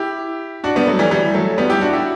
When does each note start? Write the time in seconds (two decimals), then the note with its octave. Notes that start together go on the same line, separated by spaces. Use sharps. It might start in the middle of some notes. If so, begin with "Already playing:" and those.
Already playing: E4 G4
0.64 D4 F#4
0.76 G3 B3
0.87 F#3 A3
0.99 E3 G3
1.11 E3 G3
1.34 F#3 A3
1.58 G3 B3
1.70 E4 G4
1.81 D4 F#4
1.93 E4 G4